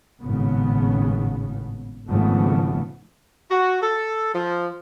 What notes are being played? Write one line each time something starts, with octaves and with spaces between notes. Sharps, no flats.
G#1 A2 C#3 B3
G#1 C#3 F3 A3 B3
F#4
A4
F3